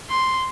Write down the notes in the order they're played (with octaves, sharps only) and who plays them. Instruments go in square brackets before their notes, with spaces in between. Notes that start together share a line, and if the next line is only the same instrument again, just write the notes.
[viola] C6